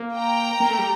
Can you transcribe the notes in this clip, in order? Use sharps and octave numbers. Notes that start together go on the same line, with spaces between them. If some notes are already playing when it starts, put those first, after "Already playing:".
Already playing: A#3
G5 A#5
A#3
A3
G3